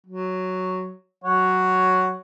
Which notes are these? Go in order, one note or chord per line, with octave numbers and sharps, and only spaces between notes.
F#3
F#3 C#5 F#5